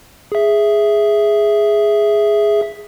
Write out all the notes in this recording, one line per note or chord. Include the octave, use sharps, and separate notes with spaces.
G#4 E5